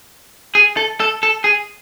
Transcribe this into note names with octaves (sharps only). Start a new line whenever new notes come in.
G#4
A4
A4
A4
G#4